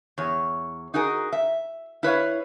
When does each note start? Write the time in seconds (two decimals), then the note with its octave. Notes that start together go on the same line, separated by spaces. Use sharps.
0.18 E2 C#5
0.94 D#4 F#4 G#4 A#4
1.33 E5
2.03 E4 B4 C#5 F5